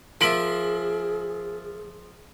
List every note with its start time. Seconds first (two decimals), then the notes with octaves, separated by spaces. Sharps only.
0.21 F3 G#4 A#4 E5 B6 D7 F#7